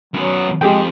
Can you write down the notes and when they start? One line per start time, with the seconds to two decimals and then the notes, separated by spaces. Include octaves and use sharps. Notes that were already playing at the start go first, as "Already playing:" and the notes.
0.14 F#2 F#3 B3
0.61 F2 G#3 G4 G#4 G5